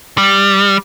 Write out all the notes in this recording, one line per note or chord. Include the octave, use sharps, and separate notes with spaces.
G3